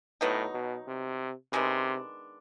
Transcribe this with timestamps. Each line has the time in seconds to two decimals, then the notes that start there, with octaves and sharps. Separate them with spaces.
0.21 A2 F#3 B3 D#4
0.54 B2
0.87 C3
1.53 C3 D#3 G#3 B3 D4